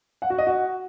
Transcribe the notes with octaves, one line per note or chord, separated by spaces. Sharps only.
F#5
F#4
D#5
F#4